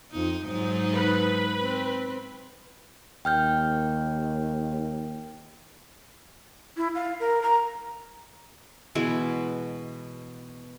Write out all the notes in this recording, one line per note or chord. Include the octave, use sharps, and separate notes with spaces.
F2 D#4
G#2 F#3 D#4
B4
C4
D#2 G5 F6 G6
E4
F5
A#4
A#5
B2 E3 G#3 E5